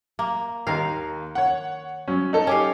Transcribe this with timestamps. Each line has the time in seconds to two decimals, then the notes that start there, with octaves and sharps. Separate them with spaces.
0.19 A#3
0.67 D#2 D#3 A#4 F5
1.35 C#5 F#5
2.08 F#3 C#4
2.33 D#4 A4
2.47 C#4 G4 F5